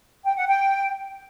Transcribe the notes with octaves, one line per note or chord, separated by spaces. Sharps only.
G5
F#5
G5